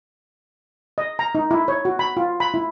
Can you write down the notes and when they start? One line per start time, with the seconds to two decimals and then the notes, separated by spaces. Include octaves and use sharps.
0.98 D#5
1.19 A#5
1.35 D#4
1.51 E4
1.68 C#5
1.85 F#4
1.99 B5
2.17 F4
2.40 B5
2.54 E4